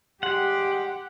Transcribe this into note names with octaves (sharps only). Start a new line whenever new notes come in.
G3 G#3 G4 F#5 C6